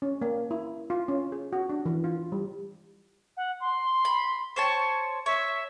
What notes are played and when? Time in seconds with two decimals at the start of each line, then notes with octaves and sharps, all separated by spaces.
0.02 C#4
0.22 A#3
0.51 E4
0.90 F4
1.08 C#4
1.32 G#4
1.53 F#4
1.70 D4
1.85 E3
2.04 F4
2.32 G3
3.37 F#5
3.60 C6
4.05 B5
4.56 C5 C#5 A5 C#6
5.26 C#5 E5